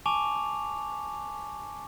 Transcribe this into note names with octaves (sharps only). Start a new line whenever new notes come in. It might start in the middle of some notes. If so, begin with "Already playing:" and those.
G#5 A5 C#6 D6 F7